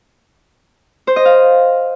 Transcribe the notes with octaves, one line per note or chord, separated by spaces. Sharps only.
C5
D#5
F5